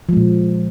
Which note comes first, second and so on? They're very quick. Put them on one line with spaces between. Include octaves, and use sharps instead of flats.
F3 G#3 A#2